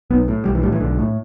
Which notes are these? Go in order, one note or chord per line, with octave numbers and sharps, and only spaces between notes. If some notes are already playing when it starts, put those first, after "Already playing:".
B1 B3
A2
B1 G3
E3
A2 G3
E3
B1 D3
A2